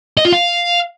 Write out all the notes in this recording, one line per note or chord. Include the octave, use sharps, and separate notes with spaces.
D#5
F4
F5